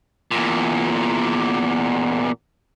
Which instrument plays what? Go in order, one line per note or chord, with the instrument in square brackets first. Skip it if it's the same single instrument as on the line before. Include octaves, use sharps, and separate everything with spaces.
[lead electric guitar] E2 A#2